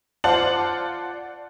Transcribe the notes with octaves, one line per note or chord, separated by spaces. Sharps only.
F4 C5 D5 F#5 A5 F#7